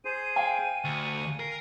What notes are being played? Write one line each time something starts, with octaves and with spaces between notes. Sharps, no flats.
G#4 C5 D#7
F5 G5 G#5
D2 C#6
A#4 C7